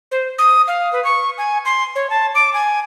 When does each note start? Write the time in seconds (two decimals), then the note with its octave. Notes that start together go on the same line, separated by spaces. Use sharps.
0.11 C5
0.38 D#6
0.68 F5
0.92 B4
1.04 C#6
1.38 G#5
1.65 C6
1.95 C#5
2.10 A5
2.35 D6
2.53 G#5